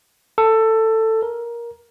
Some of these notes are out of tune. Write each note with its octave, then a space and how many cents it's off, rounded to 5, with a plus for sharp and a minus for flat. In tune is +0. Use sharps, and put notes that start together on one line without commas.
A4 +15
A#4 +15